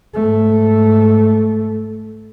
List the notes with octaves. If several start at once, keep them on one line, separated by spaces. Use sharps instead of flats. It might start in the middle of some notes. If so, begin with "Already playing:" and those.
G#2 A3